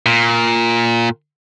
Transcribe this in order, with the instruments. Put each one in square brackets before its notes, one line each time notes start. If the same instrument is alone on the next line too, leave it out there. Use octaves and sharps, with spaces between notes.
[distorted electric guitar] A#2